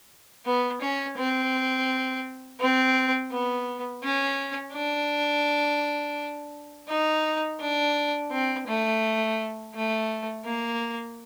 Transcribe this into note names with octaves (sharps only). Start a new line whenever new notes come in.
B3
C#4
C4
C4
B3
C#4
D4
D#4
D4
C4
A3
A3
A#3